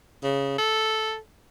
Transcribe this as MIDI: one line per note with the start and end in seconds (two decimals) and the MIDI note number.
0.23 0.54 49
0.58 1.17 69